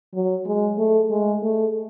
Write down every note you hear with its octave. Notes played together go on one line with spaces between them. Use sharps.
F#3
G#3
A3
G#3
A3